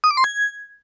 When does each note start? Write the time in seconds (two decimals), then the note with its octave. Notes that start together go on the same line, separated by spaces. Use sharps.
0.04 D#6
0.11 D6
0.17 C6
0.24 G#6